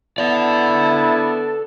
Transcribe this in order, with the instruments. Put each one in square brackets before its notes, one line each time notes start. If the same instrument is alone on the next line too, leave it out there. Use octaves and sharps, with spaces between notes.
[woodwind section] B3 A5 [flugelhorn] E4 [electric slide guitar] A4 D5